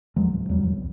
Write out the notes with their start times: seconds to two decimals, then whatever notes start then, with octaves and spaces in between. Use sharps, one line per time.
0.16 E2 F3 F#3 G#3
0.33 D1
0.49 E2 F#3 G3
0.63 E2 G2
0.77 C2